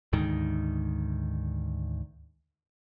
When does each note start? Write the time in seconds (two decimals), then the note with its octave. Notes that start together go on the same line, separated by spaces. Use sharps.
0.13 D2 G#2 D#3